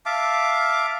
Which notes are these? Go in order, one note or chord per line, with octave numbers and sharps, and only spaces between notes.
E5 F5 A5 D6